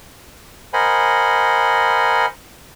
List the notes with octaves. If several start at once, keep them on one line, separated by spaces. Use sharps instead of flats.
A#4 C5 D#5 F#5 G#5 B5